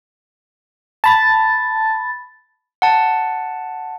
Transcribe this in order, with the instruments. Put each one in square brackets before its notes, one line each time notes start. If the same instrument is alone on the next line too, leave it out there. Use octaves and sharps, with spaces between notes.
[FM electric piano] A5 B5 A6
[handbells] F#5 A5